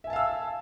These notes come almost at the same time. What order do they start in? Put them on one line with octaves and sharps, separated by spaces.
E5 G#5 A5 F5 E6